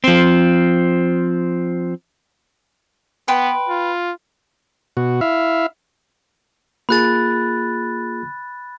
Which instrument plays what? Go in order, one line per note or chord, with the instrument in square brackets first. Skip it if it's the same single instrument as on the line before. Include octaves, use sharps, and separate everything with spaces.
[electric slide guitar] F3 C4
[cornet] B3 [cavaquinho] B4 G5 C6
[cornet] F4
[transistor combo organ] B2 F#4
E4 E5 F5
[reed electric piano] A#3 F4 G#4 [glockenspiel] B5 F#6 A6